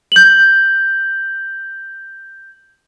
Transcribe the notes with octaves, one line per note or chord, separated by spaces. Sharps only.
G6 F#7